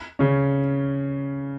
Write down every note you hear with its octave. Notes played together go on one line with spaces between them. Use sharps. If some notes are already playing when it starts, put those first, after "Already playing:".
C#3 C#4